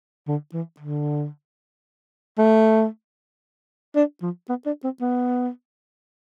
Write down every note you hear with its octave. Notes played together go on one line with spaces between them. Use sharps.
D3
E3
D3
A3
D4
F3
B3
D4
C4
B3